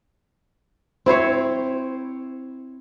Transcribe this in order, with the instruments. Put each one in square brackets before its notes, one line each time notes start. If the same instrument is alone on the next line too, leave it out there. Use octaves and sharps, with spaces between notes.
[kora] C4 E4 C5 C#5